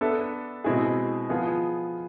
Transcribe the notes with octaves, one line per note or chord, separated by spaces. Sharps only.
B3 D4 A4 E5
B2 G#3 C4 E4 G#4
F3 B3 F4 G#4